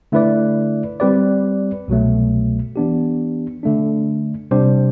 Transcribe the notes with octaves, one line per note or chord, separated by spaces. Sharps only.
D3 A3 E4 B4 D5
G3 C4 G4 B4 D5
C2 B2 F#3 A3
E3 B3 D4 G4
D3 A3 D4
C3 G3 D4 G4 C5